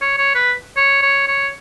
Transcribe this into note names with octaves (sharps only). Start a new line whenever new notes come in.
C#5
C#5
B4
C#5
C#5
C#5